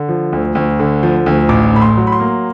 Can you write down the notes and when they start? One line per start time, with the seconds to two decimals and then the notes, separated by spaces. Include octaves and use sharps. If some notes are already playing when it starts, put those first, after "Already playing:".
Already playing: D3
0.09 F3
0.33 D2
0.55 D2
0.80 D3
1.03 F3
1.26 D2
1.49 A1 D6
1.73 A2 B5
1.82 C6
1.97 F#3
2.07 B5
2.12 C6
2.20 A#3